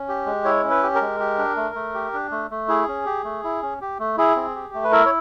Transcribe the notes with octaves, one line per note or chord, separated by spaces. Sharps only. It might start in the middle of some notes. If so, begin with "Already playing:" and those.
Already playing: C#4
G4
G#3
E4 C#5
C#4
B4
G4
A#4
G#3
G4
D4
A3
A3
G4
D4
A3
A3
E4 G#4
C#4
G4
A3
E4
C#4
G4
A3
E4 G#4
C4
G4
A3
B4
E4 A#4
C#5